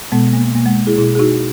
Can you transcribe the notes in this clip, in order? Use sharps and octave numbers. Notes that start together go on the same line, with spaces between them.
B2 G#3 B3
A#3
B2 A#3
G#3
E4 G#4
B2 E4 G#4
G#4
D#4 F#4